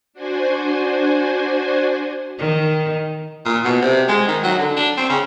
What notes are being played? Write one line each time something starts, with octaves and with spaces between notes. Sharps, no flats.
D4 F#4 C5 G#5
D#3
A#2
B2
C3
G#3
D#3
F#3
D3
D4
C4
C#3